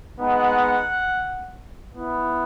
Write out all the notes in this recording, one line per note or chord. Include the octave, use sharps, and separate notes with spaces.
G#3 B3 D#4 F#5
B3 E4